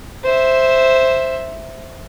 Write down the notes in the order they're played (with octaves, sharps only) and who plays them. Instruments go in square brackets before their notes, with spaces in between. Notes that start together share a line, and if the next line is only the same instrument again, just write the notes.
[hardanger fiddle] C5 E5